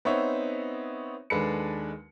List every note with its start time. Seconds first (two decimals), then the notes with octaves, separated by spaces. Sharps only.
0.05 B3 C4 D#4 C#5 E5
1.30 D#2 G#3 D4 A4 B4 C#7